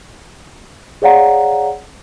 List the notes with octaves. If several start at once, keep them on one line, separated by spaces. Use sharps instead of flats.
G#4 C#5 D5 F5 F#5 A#5